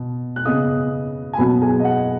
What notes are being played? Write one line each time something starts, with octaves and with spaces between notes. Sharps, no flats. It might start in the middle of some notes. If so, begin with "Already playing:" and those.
Already playing: B2
F#6
C#3 B3 D#5 D#6
G#5
B2 F#3 B3 B4 B5
G#4 G#5
D#5
F#5